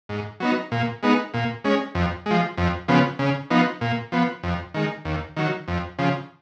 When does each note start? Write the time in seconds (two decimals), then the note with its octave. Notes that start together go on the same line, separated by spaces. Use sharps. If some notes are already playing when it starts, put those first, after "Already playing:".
0.09 G#2
0.40 F#3 B3 D#4
0.72 A#2
1.03 G#3 B3 D#4
1.34 A#2
1.64 G#3 C#4
1.95 F2
2.26 F3 G#3
2.58 F2
2.88 C#3 F3 B3
3.19 C#3
3.50 F3 B3 D#4
3.81 A#2
4.12 F3 B3
4.43 F2
4.74 D#3 G#3
5.05 D#2
5.36 D#3 F#3
5.68 F2
5.99 C#3 F3